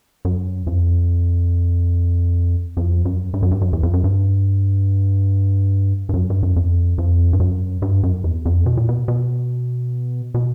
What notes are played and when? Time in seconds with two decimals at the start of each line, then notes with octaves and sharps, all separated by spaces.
0.25 F#2
0.67 F2
2.77 F2
3.05 F#2
3.34 G2
3.42 F#2
3.51 G2
3.61 F#2
3.73 E2
3.83 F2
3.93 F#2
4.04 G2
6.09 G2
6.14 F#2
6.30 G2
6.43 F#2
6.56 F2
6.98 F2
7.33 G2
7.40 F#2
7.82 G2
8.03 F#2
8.24 E2
8.45 F2
8.66 B2
8.77 A#2
8.89 B2
9.08 B2
10.34 B2